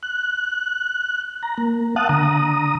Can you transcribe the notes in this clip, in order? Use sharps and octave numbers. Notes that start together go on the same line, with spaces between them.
F#6
A#5
A#3
F5 F#5 A5 D#6 F#6
D3 A#5 D#6